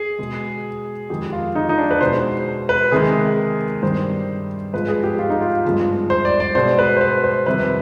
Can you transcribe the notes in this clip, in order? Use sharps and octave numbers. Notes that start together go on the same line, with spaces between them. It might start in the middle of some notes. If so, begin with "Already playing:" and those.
Already playing: G#4
B2 G#3
F2 D#3 G#3 G4
F4
D#4
D#4
D4
B4
B2 G#3 C5
B4
C3 D#3 G#3 G#4
G2 D#3 G3 C5
G#2 F3 G#3 B4
G#4
G4
F4
D#4
F4
G2 F3 G#3
C5
D5
D5
B2 G#3 C5
B4
C5
B4
C5
F2 C3 D#3 G3 B4